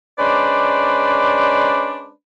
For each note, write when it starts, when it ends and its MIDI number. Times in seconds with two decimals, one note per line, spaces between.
0.19 2.09 56
0.19 2.09 61
0.19 2.09 62
0.19 2.09 71
0.19 2.09 72
0.19 2.09 74